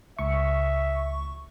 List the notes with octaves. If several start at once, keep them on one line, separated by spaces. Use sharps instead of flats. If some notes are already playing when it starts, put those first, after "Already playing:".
C#2 E5 C#6